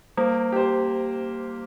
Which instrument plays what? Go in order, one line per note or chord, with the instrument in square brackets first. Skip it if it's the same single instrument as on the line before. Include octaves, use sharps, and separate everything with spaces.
[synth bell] G3 [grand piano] A#3
[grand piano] G4 C5